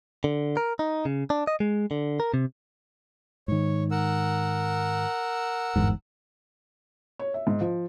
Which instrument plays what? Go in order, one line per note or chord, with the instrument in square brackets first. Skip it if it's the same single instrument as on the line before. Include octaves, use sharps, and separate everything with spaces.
[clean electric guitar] D3
A#4
D#4
C#3
D4
D#5
G#3
D3
A#4
C3
[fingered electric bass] G#2 D#3 [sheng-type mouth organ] C#5
[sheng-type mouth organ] A#4 F#5 E6
[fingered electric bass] G1 E2 G#2
[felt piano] C#5
E5
G#2
F3